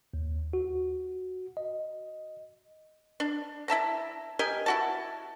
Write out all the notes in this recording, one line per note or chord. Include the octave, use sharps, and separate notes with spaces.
D#2
F#4
D#5
D4
E4 E5 A5 A#5
G4 A#4 D#5 G#5
E4 F#4 A5